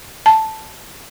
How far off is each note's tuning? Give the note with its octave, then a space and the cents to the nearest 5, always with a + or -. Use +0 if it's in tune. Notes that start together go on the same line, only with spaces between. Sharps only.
A5 +0